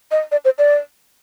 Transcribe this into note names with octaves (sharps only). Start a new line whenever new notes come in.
D#5
D5
C5
D5